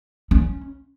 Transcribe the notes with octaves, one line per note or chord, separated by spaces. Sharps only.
C#4